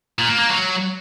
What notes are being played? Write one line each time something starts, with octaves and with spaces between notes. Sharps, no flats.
A#2
A#3
A#3
F#3